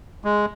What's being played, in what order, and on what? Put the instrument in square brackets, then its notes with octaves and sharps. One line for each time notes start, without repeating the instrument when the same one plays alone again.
[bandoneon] G#3